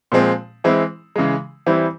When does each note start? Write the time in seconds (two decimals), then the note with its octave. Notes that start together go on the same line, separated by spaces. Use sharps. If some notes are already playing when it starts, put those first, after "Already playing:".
0.12 A#2 F3 G#3 C4
0.64 E3 G#3 C4 E4
1.16 C#3 E3 G#3
1.66 E3 G3 C4 E4